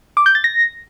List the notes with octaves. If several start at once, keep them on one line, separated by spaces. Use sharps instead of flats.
D6
G6
A6
A#6